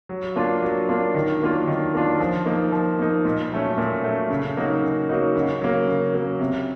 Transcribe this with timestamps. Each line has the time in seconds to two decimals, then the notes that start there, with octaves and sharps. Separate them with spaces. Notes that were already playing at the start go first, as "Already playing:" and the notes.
0.09 F#3
0.36 A#3 D4 F4
0.62 F#3
0.89 A#3 D4 F4
1.15 D#3
1.42 F#3 A#3 D4 F4
1.67 D#3
1.94 F#3 A#3 D4 F4
2.20 F3
2.46 A#3 D#4
2.72 F3
2.99 A#3 D#4
3.25 A#2
3.51 F#3 A3 C#4
3.78 A#2
4.03 F#3 A3 C#4
4.30 C#3
4.57 F#3 A#3 D#4 F#4
4.83 C#3
5.09 F#3 A#3 D#4 F#4
5.35 C#3
5.62 F#3 A#3
5.87 C#3
6.14 F#3 A#3
6.40 C3